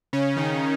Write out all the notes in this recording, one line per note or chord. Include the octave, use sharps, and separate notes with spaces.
C#3 C#4
D#3 D#4